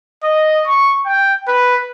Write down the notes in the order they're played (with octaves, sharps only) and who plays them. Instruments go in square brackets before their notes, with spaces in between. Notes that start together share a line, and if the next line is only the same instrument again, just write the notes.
[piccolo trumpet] D#5
C#6
G5
B4